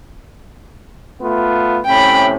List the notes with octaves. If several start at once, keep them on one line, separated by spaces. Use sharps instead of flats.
A3 B3 F4
A2 C3 C#4 G5 B5